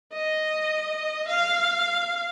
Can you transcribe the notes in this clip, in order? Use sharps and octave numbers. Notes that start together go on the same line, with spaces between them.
D#5
F5